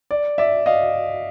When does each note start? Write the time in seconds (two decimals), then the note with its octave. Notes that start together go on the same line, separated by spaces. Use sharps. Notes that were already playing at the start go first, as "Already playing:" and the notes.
0.11 D5
0.38 D5 E5
0.66 D#5 F5